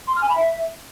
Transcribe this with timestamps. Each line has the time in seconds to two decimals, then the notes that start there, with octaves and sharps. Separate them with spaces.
0.08 C6
0.15 F6
0.22 G#5
0.29 B5
0.36 E5